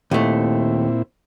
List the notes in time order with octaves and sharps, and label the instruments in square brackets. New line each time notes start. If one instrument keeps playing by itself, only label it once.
[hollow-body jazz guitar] D#2 A3 [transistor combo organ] A#2 C4 E4